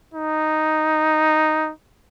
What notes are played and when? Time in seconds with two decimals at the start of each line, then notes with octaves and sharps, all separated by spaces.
0.14 D#4